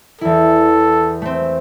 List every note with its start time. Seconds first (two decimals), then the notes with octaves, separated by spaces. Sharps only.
0.21 E2 E4 A4
1.22 A3 C4